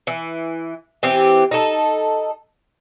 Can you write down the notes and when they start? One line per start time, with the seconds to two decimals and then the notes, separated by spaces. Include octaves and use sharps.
0.07 E3
1.03 E3 C4 G4
1.51 D#4 A4